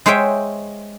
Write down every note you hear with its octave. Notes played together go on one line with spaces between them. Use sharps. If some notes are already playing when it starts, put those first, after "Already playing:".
G#3 C5 C#5 E5 G5